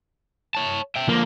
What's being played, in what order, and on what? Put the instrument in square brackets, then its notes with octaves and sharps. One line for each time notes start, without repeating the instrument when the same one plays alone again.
[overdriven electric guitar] C#5 A5
E5 G5
[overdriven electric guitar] D3 F3 [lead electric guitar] A#3